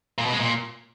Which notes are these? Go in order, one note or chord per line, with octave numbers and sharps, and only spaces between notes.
A#2
B2
G#3
A#2